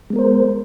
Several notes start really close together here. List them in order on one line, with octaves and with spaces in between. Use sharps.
G#3 B3 A#4 C5